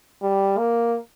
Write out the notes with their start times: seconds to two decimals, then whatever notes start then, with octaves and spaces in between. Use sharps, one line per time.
0.22 G3
0.58 A#3